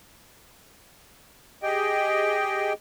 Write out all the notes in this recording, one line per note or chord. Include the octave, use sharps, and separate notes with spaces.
G4 G#4 D#5 G5